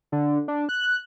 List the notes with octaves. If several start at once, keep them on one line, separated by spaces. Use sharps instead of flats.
D3
D4
F#6